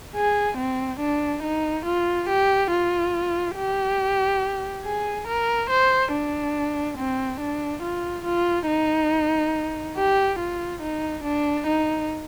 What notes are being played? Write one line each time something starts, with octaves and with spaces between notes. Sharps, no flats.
G#4
C4
D4
D#4
F4
G4
F4
G4
G#4
A#4
C5
D4
C4
D4
F4
F4
D#4
G4
F4
D#4
D4
D#4